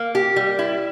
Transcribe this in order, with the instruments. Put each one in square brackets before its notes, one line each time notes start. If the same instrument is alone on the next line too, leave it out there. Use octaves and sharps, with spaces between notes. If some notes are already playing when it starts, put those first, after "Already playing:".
Already playing: [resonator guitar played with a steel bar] A#3
G4
G3
E4